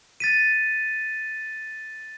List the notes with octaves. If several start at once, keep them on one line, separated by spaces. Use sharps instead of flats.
A6 B6 D#7